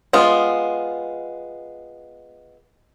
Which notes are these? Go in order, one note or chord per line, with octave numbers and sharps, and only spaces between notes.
G#3 B3 F4